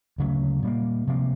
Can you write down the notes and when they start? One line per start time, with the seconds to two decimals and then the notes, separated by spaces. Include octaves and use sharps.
0.18 D2 C#3 F#3 A3
0.62 A#2 G3 A#3
1.07 C3 F3 A#3